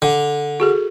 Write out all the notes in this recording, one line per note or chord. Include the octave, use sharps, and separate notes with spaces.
D3
F#4 G#4 A4